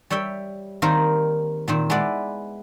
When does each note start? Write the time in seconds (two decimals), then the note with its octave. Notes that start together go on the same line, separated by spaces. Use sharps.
0.10 G3 C#5 E5 G5
0.82 D#3 G3 A#3 C4 A#4 C5
1.68 A#2 D#3 C4
1.90 G#3 B3 E4 B4 D5